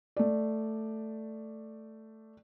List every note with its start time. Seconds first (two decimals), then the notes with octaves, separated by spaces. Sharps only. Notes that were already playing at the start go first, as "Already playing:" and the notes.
0.17 A3 D5